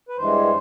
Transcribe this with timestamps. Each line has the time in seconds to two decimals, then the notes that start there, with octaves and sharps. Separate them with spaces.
0.09 B4
0.17 G2 E3 G#3 C5